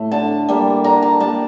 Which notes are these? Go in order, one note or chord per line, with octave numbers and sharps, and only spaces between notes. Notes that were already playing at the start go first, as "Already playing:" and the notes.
Already playing: A2 A3
D3 A5
G3 A#3
D3 A#5
A5
G3 A#3 A5